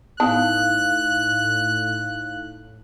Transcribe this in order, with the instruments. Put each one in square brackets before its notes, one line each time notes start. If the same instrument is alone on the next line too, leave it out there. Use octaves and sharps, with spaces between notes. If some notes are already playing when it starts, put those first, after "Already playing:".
[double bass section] A2 [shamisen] B3 A5 [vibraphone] D#4 E4 F5 [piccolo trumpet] F#6